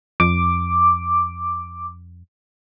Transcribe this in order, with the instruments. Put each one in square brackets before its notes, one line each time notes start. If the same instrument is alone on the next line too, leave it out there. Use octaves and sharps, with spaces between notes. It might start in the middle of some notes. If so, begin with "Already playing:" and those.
[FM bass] F2 [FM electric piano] D6